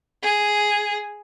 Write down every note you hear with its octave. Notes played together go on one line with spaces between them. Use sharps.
G#4